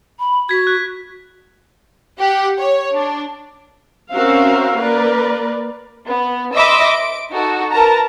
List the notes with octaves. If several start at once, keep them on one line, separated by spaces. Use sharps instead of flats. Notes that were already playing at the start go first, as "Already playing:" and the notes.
B5
F#4 G#6 B6
F#6
G4 F#5
C#5
D4
C4 C#4 F#4 A#4 E5 F5
A#3 A#4 B4 D5
B3
D#5 E5 B5 C6 D6 E6
D7
D#4 F#4 A4
A#4 B4 A5 A#5